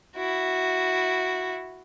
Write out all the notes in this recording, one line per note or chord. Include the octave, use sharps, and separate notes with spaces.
E4 F#4